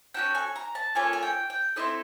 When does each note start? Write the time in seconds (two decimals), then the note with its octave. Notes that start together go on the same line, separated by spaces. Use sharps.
0.14 C#4 F#4 A4 G5
0.35 G#5
0.56 A#5
0.75 A5
0.95 A#3 C#4 F4 A4 G#5
1.13 G#5
1.23 G5
1.50 G5
1.76 C4 E4 A4 D#5